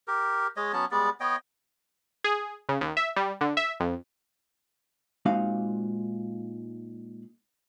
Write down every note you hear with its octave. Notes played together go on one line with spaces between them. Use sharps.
G4 A#4
G#3 C#5 D#5
F#3 B3 C#4 A5
G3 G#3 B3 D5
B3 C#5 D#5 G5
G#4
C#3
D#2
E5
G3
D3
E5
F2
A#2 G#3 C4 D#4 F#4 F5